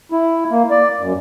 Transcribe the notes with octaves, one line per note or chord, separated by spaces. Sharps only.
E4
A#3
D5
F#2